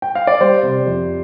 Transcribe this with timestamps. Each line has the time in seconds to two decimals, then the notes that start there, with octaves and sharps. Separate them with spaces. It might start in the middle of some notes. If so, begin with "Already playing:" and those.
0.02 G5
0.15 F5
0.27 D5
0.40 G3 C5
0.63 C3
0.86 F2